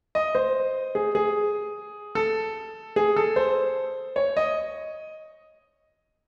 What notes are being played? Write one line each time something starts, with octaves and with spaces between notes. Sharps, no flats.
D#5
C5
G#4
G#4
A4
G#4
A4
C5
C#5
D#5